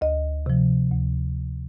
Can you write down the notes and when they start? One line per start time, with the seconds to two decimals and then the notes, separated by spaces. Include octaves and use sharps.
0.01 D2 D#5
0.46 C3 F3
0.92 D2